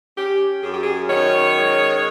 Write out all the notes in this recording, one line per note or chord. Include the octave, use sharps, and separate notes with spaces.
C#4 G4
F#2 G#4
G4
G#4
D#3 C#5
G#3